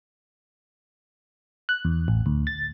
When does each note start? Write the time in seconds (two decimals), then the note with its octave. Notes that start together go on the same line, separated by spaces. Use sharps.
1.69 F#6
1.85 E2
2.08 A1
2.26 D2
2.47 A6